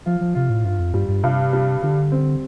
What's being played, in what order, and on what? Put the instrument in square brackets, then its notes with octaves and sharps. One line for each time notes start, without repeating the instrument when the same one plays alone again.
[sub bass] F3 [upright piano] F4
[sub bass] F3
[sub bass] C3 [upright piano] F4
[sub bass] A2
[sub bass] G2 [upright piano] F4
[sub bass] F2
[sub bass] G2 [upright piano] G3
[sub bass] G2
[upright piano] G2 [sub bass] C3
[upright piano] G3
[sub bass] D3 [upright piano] G3
[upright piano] C4